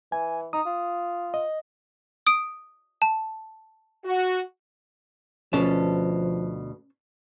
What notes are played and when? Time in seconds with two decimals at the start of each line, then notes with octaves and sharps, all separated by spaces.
0.12 E3 G#5
0.53 D#4 D#6
0.66 F4
1.34 D#5
2.27 D#6 D7
3.02 A5
4.04 F#4
5.53 D2 B2 F3 C#4 A4 A5